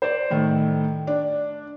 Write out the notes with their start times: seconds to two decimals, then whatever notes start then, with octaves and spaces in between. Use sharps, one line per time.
0.02 C5 D5
0.31 A2 D#3 A3
1.07 D4